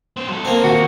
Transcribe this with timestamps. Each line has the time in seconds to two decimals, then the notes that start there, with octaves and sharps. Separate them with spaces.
0.17 B3 C5
0.29 F#3 A4
0.45 A#3 C4
0.64 D#2 F#4